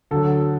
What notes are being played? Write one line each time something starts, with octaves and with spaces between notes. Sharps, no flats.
D2 D3 F#3 A4